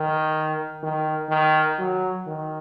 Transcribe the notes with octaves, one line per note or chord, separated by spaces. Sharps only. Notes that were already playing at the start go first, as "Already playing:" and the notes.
Already playing: D#3
D#3
D#3
F#3
D#3